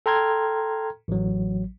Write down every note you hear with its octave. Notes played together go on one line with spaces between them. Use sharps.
A4 G5 A#5 C6 F6 G#6
A1 F#3